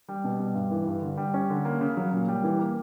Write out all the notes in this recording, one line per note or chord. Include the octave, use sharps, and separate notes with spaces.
G3
B2
G3
G2
E3
G2
D3
G3
C#4
D3
A#3
C#3
F#3
A#2
G3
E3
A#3